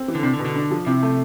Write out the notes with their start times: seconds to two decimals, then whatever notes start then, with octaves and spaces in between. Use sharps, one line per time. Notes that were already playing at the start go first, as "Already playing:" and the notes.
Already playing: C4
0.08 E3
0.15 D3
0.23 C3 D4
0.33 D3
0.39 B2
0.45 D3
0.56 D4
0.71 F3
0.86 C3 E4
1.02 A3